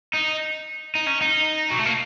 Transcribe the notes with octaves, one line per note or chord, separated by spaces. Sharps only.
D#4
D#4
C#4
D#4
F#3
A3
A#3